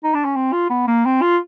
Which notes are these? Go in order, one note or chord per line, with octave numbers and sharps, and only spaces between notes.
D#4
D4
C#4
C4
F4
B3
A#3
C4
F4